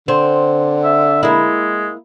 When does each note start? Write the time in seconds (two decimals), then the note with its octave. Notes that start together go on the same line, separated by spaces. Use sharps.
0.08 D3 C4
0.84 E5
1.23 G#3 A#3 E4